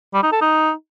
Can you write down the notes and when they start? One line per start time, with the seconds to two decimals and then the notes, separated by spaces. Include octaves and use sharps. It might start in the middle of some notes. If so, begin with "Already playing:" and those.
0.14 G3
0.23 D#4
0.32 A4
0.42 D#4